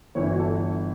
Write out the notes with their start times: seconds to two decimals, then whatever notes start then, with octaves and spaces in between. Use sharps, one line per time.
0.15 G1 G2 E3 C#5
0.23 E4
0.31 F#4
0.39 A4